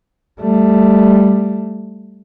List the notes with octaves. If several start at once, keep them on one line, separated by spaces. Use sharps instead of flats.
G3 A3